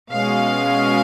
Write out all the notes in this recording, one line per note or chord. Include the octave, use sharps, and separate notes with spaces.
B2 G#3 C#4 F5